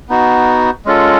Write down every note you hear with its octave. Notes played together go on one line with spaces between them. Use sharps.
B3 D#4 F#4
G#3 C#4 F4 A4